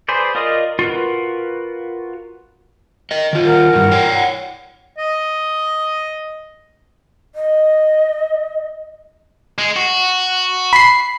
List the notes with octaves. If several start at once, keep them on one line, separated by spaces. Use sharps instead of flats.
G#4 B4 C5 D5
F4 A#4 D5 D#5 D#6
F4 F#4 A#4 B4
A#4 D#5
D#3 F4
A#4 F#5
G2 E3
C#5 D5 G5
F#5
D#5
D#5
G#3
F#4
B5 C7